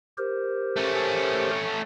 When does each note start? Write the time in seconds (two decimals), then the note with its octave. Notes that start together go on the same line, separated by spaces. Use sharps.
0.18 G4 A#4 C5
0.76 A3 C#4